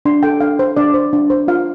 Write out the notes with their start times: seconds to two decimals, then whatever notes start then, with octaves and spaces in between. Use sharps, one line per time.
0.05 D4 C6
0.23 A4 G5
0.40 D4 F5
0.59 C5
0.77 D4 D5
0.94 C5
1.13 D4
1.30 C5
1.48 F4 F5